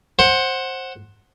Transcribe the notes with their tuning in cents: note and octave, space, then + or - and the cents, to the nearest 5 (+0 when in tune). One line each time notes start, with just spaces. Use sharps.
C5 +20 F#5 +0